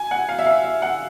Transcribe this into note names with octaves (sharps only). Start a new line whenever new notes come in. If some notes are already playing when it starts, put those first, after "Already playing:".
Already playing: G#5
F#5
F5
E5
F5
E5
F#5